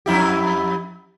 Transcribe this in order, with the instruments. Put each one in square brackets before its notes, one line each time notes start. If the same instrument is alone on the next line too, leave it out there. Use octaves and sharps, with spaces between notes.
[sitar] F2 E4 G4